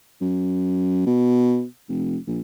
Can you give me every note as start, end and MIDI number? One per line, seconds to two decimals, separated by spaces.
0.21 1.04 42
1.06 1.64 47
1.89 2.17 29
2.27 2.40 34